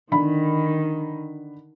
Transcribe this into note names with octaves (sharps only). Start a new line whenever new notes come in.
D3 D#3 B5